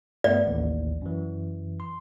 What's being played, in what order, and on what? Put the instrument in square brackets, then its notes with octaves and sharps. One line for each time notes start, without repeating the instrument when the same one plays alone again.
[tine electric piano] G2 A3 B3 [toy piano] D5
[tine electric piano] A1 D#2
F#2 E3
C6